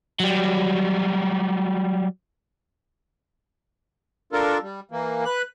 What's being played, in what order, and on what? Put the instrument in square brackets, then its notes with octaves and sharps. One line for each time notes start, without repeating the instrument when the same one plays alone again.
[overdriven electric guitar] F#3 G3
[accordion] D4 F4 A4 A#4
G3
E3 A#3
B4 F#6